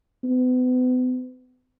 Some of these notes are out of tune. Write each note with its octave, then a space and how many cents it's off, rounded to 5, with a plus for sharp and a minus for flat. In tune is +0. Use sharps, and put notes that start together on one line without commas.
B3 +40